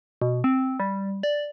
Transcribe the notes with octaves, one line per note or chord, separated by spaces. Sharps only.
B2
C4
G3
D5